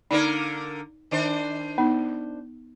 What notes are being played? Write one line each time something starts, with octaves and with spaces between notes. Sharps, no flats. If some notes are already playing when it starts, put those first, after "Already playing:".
D3 A#3 D#4 A#4 D5
D#3 D4 C5
B3 D#4